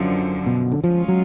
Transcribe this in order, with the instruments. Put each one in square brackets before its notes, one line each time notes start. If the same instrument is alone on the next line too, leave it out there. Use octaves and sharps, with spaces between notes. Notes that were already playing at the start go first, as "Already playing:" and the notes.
Already playing: [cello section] F#2 D3 F3
[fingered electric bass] B2
D3
[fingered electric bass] F3 [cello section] G#3 C#4 F4
[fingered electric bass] F#3